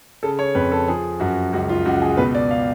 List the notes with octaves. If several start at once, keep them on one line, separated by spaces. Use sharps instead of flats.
C#3 A4
C#5
F2 B4
A4
F3 G#4
F#2 F#4
C#2 F#4
F4
C#2 F#4
G#4
B2 B4
D5
F5